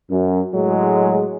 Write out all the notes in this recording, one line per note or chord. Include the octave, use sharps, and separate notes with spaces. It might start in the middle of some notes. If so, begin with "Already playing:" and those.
F#2
A2 F#3 G#3